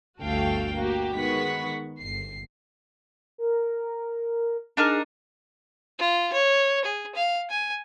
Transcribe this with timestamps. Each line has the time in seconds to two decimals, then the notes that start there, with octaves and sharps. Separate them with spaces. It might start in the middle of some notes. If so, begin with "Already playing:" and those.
0.21 G1 D2 F#4 A4 F5 G5
0.78 A#3 F#4 G4
1.14 D#3 G#3 B3 F#5 C#6 B6
1.99 G1 C7
3.38 A#4
4.77 D4 D#4 G#4 A#4
5.99 F4
6.33 C#5
6.85 G#4
7.15 F5
7.50 G#5